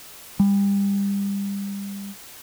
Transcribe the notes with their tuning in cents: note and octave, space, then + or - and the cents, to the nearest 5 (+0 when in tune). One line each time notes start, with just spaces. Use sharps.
G3 +30